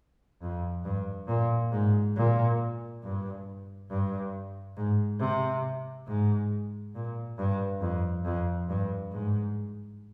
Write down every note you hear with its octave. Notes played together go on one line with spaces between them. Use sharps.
F2
G2
A#2
G#2
A#2
G2
G2
G#2
C3
G#2
A#2
G2
F2
F2
G2
G#2